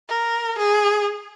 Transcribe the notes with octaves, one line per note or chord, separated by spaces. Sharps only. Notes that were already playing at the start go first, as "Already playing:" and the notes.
A#4
G#4